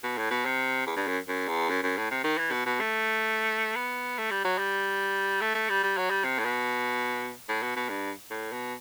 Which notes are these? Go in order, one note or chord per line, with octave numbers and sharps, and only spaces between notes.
B2
A2
B2
C3
E2
G2
F#2
F#2
E2
F#2
F#2
A2
C3
D#3
E3
B2
B2
A3
B3
A3
G3
F#3
G3
A3
A3
G3
G3
F#3
G3
C3
A2
B2
A2
B2
B2
G2
A2
B2